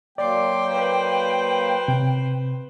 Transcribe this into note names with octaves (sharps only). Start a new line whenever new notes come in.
F#3 A#3 D5 G5 C6 D6
B4 C5
C3